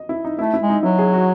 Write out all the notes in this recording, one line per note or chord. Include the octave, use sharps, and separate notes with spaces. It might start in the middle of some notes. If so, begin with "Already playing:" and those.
Already playing: D#5
E4
D#4
A3 E4
E4
G#3
D#4
F#3 E4
G#4
F#4